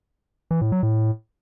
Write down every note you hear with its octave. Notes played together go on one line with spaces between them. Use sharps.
E3
A2
F#3
A2